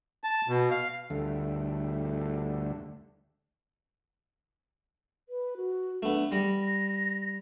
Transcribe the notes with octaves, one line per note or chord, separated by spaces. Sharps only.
A5
B2
F5
D2 D3 G3 A3
B4
F#4
A3 B3 D4
G3 A#6